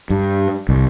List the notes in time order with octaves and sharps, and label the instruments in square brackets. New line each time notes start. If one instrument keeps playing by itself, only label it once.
[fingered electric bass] G2
C2